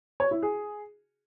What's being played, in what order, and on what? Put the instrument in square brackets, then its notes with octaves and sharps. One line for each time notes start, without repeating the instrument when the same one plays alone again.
[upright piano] C#5
E4
G#4